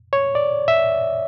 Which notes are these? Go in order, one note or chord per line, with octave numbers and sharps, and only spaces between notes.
C#5
D5
E5